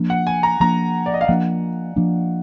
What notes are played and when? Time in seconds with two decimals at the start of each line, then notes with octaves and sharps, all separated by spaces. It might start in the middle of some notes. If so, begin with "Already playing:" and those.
Already playing: F3 A#3 D4
0.10 F#5
0.27 G#5
0.43 A#5
0.60 F3 A#3 D4 A#5
1.06 D5
1.14 D#5
1.21 F5
1.28 F3 A#3 D4 F#5
1.96 F3 A#3 D4